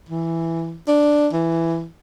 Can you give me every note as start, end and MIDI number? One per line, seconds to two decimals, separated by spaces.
0.09 0.78 52
0.88 1.28 62
1.33 1.87 52